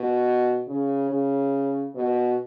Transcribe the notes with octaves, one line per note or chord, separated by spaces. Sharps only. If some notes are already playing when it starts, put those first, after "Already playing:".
Already playing: B2
C#3
C#3
B2